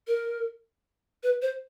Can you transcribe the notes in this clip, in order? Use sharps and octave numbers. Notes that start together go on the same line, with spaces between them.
A#4
B4
C5